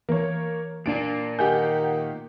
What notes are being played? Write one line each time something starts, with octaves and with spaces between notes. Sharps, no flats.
E3 A#3 C#5
A#2 A#3 D4 D7
D#3 G4 F#5 G#5 G6